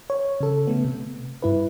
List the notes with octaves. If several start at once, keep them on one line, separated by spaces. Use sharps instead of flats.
C#5
C#3 A4
C#3 A3 B3
C3
G2 E4 B4